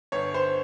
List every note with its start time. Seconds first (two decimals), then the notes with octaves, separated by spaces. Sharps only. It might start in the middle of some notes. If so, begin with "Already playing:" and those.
0.12 G1 C#5
0.34 C5